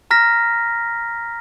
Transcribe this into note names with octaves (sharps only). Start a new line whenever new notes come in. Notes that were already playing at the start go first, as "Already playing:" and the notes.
A#5 F6 A#6 B6